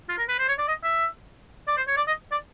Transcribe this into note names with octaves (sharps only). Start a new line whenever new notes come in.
F4
A#4
B4
C5
C#5
D5
D#5
E5
D5
C5
C#5
D5
D#5
D5